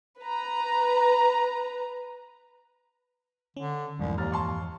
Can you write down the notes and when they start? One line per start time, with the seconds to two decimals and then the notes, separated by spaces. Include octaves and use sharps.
0.21 B4 A#5
3.57 D3 C#4
4.00 C2 F2 G#2 E3
4.18 D#2 A#5 F6 A6
4.32 A5 C6 C#6